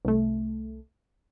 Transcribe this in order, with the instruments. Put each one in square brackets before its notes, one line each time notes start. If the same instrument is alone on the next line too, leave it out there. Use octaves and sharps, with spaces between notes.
[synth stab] C2 A3